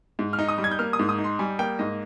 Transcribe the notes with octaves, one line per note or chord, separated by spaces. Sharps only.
G#2
F6
D#4
D#6
G3
G#6
G6
A#3 F6
D#6
G#2
D#6
D#4
C6
G3 G#5
A#3 G5
G#2 D#5